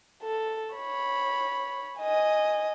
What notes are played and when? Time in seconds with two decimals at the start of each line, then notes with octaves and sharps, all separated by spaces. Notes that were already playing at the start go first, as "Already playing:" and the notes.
0.23 A4
0.74 C#5 B5
1.99 D#5 G#5